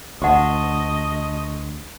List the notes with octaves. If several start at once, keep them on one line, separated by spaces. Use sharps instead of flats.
D2 C5 D#5 F#5 A5 C6 C#6